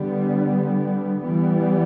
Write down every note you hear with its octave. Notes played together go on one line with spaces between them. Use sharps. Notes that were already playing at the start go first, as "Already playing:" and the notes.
Already playing: D3 G3 B3
E3 G3 B3